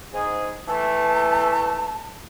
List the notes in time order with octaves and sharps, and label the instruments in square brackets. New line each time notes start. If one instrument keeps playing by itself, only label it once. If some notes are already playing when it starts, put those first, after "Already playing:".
[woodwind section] G#2 G#4
[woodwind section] E3 A3 [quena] A5